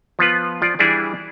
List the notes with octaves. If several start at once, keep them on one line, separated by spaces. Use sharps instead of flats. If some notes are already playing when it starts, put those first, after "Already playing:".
F3 B3 F4 B4
F3 F4 D5
E3 G3 D4 E4 G#4 D5